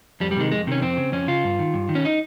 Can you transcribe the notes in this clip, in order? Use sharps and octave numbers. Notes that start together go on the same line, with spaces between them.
F2 G3
G3
C3 D#3 G#3
F2 G#3
C3 D#3 C#4
F2 C4
C#3
F2 C#4
C#3 F4
G2
D#3
G2
D#3
C#4
D#4